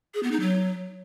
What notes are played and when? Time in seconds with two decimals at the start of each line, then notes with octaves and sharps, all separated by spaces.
0.14 G#4
0.23 B3
0.31 D#4
0.40 F#3